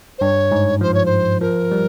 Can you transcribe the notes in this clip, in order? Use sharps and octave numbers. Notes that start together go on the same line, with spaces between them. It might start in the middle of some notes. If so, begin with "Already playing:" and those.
C5
G2 C#5
G#2
F3 C5
C#5
C5
F3 A#4
G3